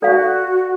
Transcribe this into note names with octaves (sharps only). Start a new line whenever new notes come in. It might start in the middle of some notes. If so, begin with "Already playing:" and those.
F#4 A4 D5 F5